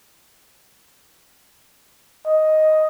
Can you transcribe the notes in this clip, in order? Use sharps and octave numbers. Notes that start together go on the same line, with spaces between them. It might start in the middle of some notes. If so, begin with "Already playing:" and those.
D#5